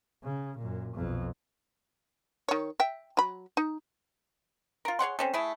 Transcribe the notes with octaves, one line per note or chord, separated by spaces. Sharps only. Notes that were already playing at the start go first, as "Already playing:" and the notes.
C#3
F#2 A#2
B1 F2
D#3 C#5
E5 G5
F#3 B5
D#4
F4 A#4
G#4 C#5 F#5 C6
C4 C#4 A4
A3 E4 G#4